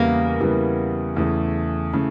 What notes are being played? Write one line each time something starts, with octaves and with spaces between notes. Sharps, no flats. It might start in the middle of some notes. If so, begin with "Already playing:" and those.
Already playing: E2 C#3 E3 G3 A#3 B3
E2 C#3 E3 G3 B3
E2 C#3 E3 A3
C#3 E3 A3